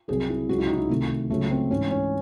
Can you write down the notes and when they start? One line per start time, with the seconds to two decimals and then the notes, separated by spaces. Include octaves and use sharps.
0.08 C2 C3 F#3 G#4
0.29 E4
0.49 C#2 C#3 F#3 F#4
0.58 E4
0.67 D#4
0.78 E4
0.89 C2 C3 D#3 A3
1.30 C#2 C#3 F#3 A3
1.51 C4
1.71 G#2 E3 C#4
1.91 C#4